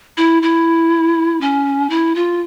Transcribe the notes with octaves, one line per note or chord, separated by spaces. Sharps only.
E4
E4
C#4
E4
F4